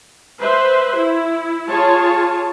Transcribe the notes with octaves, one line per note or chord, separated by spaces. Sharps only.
B4 C5 E5
E4
F4 G#4 C#5 A5